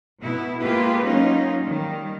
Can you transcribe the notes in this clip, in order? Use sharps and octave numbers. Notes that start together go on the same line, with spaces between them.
B2 B3 E4
G#3 A#3 F4 G4 G#4 B4
F#3 A#3 C#4 D#4 F4
D#3 G3